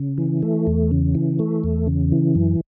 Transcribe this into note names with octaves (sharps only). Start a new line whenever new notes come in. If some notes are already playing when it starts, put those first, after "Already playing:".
Already playing: C#3
E3
A3
E2
C#3
E3
A3
E2
C#3
E3
F#2